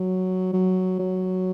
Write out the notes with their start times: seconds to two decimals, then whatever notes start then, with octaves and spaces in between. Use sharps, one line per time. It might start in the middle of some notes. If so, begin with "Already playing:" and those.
Already playing: F#3
0.53 F#3
0.99 F#3